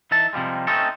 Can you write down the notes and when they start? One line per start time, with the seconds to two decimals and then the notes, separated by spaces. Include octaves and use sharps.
0.11 E3 D#4 E5 A5
0.33 C3 F3 G3 G#3
0.67 A3 C4 C#4 D#4 A4